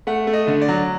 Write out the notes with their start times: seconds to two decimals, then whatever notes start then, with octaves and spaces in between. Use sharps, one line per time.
0.07 A3 F#5
0.27 A3
0.33 D#5
0.47 D3
0.62 D5
0.69 F#3